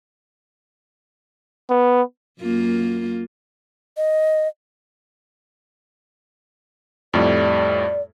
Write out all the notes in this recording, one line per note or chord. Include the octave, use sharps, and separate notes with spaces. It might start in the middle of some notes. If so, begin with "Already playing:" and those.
B3
F#2 A#3 F4
D#5
F2 A2 G3 D5